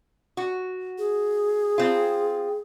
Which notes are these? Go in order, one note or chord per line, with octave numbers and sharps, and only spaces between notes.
F#4
G#4
C4 F4